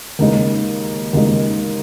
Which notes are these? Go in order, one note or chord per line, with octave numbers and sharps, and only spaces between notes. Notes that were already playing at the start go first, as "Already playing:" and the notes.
D#2 C#3 G#3 D#4
D#2 C#3 G#3 D#4